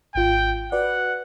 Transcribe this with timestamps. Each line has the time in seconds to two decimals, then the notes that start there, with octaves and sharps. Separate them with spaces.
0.15 G#1 F4 G5
0.72 F#4 B4 D5 F#5